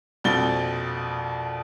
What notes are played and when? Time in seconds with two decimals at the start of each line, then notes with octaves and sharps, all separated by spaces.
0.24 A#1 F2 B2 A6 G7